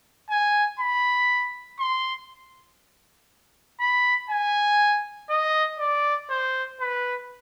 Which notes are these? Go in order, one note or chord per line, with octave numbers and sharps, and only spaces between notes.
G#5
B5
C6
B5
G#5
D#5
D5
C5
B4